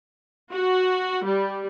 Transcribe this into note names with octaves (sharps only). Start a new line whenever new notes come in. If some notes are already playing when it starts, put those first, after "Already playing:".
F#4
G3